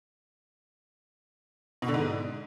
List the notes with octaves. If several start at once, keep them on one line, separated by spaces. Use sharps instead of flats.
B2
D3
G#2